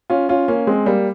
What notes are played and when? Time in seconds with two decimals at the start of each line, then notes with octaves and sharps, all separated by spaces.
0.10 C#4 F4
0.29 C#4 F4
0.48 A#3 C#4
0.67 G#3 C4
0.86 G3 A#3